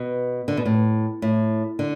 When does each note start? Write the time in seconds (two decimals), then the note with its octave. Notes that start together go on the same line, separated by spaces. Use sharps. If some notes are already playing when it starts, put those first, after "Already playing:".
Already playing: B2
0.48 D3
0.57 B2
0.65 A2
1.22 A2
1.79 D3